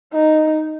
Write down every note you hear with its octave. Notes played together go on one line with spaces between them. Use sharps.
D#4